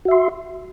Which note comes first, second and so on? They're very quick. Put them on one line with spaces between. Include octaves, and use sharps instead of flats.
F#4 E5 C6